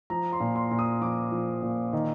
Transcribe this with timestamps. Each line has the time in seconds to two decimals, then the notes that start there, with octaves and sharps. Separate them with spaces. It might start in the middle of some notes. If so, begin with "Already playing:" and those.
0.10 F3 A#5
0.33 C6
0.40 A#2
0.56 C6
0.71 A#2
0.79 D#6
1.01 F3 D6
1.32 F3
1.62 A#2
1.93 D#3